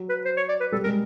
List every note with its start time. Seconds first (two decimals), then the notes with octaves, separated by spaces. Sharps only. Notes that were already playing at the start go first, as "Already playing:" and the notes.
Already playing: F#3
0.09 B4
0.25 C5
0.37 C#5
0.49 D5
0.60 B4
0.72 G3 A4
0.84 G#3 A#4